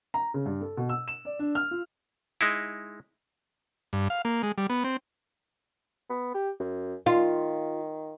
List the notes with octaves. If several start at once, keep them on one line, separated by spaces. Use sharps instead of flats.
A#5
C#3
G2
A4
B2
E6
E7
D5
D4
F6
F4
G#3 D#4 E4
G2
F5
A#3
G#3
G3
B3
C4
B3
G4
F#2
D#3 F4